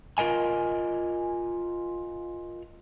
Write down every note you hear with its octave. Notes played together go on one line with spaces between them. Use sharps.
F4 A#4 D#5 G#5